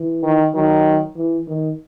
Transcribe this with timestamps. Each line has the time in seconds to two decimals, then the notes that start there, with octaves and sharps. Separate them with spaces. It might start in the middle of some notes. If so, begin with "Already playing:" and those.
Already playing: E3
0.24 D#3
0.55 D#3 F#3
1.16 E3
1.48 D#3